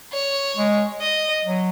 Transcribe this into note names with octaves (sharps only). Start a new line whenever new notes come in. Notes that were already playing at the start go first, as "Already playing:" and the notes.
C#5
G#3
D#5
F#3